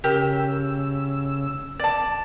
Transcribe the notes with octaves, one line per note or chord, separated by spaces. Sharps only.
C#3 G4 A#4 E6
D5 A5